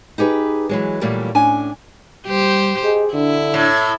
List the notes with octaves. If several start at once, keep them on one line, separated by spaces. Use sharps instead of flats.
D#4 G4 G#4 B4
E3 F#3 G#3
A#2 E3 F#3 G3 A3 A#3
A2 C#4 D4 G#5
G3 G4 C5
G#4 D#5
D3 D4 E4
A2